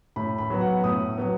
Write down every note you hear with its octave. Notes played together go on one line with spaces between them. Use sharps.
A2 B5
B5
F#3 B3
F#5
A2 D#6
F#3 B3